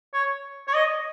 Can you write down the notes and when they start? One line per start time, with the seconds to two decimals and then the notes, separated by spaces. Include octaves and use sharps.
0.13 C#5
0.67 C#5
0.75 D#5